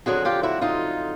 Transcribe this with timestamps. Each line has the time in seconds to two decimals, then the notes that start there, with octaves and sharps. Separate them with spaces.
0.06 F2 D3 F#3 F#4 G#4
0.25 F4 G4
0.43 E4 F#4
0.61 D#4 F4